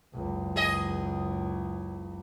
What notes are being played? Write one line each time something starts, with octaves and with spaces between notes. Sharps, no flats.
F#1 C#2
G#4 D#5